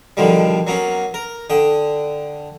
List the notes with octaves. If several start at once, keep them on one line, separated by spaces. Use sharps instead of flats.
B1 D3 D#3 F3 G3
F#3 A#3 B3 C#4
A#4
D3 G5 D#6